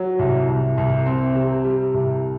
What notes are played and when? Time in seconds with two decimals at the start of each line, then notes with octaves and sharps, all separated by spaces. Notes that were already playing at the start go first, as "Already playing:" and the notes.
Already playing: F#3
0.19 C2
0.48 C2
0.78 C2
1.06 C4
1.35 C3
1.64 G3
1.94 C2